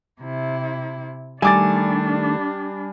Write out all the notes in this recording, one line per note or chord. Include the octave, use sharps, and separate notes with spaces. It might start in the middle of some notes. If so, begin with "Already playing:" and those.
C3 E4
D#3 G3 A3 D4 G#5 D6 A6